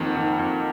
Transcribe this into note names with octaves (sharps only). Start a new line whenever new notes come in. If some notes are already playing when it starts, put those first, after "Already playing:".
Already playing: F2 D#3 A#3 F#5
D#3
F2